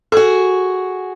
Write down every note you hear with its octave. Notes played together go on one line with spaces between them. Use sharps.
F#4 G#4 A4